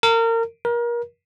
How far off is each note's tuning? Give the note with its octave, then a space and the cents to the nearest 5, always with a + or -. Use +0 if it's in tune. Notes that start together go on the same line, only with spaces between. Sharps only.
A#4 -30
A#4 +30